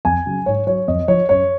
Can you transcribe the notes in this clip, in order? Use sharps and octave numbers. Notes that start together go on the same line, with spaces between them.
F2 G#5
C#3 F#3
G#2 C#5
F#3 C#5
F2 D#5
F3 C#5
F#2 C#5